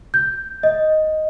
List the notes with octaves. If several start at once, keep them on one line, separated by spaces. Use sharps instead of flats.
G6
D#5